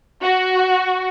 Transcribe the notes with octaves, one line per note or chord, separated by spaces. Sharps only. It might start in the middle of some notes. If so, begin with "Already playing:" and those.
F#4